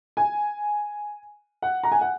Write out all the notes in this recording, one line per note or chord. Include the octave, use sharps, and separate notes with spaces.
G#5
F#5
A#5
G#5
F#5